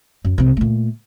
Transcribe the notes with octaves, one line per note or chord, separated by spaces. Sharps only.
F#2
C2 C3
A#2 A3